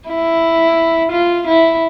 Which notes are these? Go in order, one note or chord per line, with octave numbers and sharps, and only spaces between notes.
E4
F4
E4